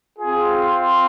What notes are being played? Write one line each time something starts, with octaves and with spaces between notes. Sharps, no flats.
C4 F4 G#4